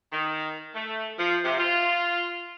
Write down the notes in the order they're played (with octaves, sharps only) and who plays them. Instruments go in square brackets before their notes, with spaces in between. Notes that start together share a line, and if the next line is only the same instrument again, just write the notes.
[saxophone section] D#3
A3
F3
C3
F4